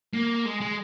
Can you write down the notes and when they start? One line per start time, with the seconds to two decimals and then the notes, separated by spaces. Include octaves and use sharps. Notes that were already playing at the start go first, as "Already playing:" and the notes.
0.14 A#3
0.45 G#3
0.61 G#3